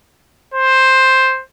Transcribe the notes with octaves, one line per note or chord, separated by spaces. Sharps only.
C5